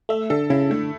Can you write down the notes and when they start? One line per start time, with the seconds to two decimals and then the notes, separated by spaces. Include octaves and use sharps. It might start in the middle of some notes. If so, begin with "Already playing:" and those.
0.09 A3 E5
0.30 D3 A4
0.50 C#3 E4
0.70 D3 A3